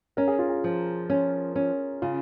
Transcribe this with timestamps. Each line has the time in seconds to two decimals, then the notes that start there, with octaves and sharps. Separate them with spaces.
0.17 C#4 A#4
0.28 G#4
0.39 F4
0.49 G#4
0.64 F3
1.10 C#4
1.56 C#4
2.02 C#3 F4